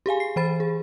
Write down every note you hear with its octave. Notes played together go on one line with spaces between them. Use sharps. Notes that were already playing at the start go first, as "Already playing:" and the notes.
G4 G#4 F5 G#5
C7
E3 C5 B5 A6
G#4